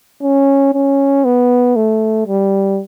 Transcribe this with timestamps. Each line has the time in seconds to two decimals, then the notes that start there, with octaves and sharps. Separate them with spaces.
0.22 C#4
0.73 C#4
1.25 B3
1.76 A3
2.27 G3